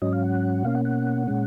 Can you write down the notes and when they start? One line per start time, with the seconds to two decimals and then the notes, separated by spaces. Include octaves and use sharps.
0.02 G#2 F#3 C#4 D#5
0.13 F5
0.23 F#5
0.64 B2 A#3 C#4 F5
0.75 F#5
0.85 F#5
1.27 A#2 G#3 C#4